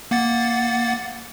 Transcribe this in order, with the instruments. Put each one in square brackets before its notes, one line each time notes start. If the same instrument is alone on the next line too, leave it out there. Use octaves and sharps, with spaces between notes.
[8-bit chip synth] A#3 F#5 A6